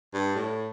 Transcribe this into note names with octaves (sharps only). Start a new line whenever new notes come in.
G2
A2